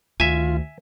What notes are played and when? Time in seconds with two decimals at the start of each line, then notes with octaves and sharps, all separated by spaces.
0.20 D2 D#3 F4 E5 G#5